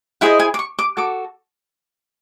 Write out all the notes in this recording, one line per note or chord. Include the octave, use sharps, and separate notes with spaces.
E4 G#4 C5 D#5 F#5
G#5
D6
C#6
D6
F#4 A4 D6